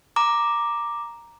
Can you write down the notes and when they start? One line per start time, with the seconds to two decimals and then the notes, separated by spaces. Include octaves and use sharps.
0.16 A#5 D6